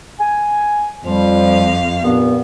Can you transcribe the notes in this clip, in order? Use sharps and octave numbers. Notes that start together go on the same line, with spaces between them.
G#5
F2 F3 G3 F5
G2 A#2 B3